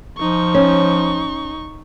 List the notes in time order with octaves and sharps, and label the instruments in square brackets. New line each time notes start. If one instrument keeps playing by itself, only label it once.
[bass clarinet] F3 [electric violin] D#4 C#6
[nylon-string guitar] C#4